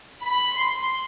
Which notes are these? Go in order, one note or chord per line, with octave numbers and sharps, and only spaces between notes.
B5
C6